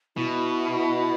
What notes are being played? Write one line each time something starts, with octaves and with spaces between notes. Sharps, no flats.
B2 E4